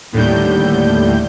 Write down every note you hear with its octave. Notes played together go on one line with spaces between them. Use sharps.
D#2 A2 D3 G3 G6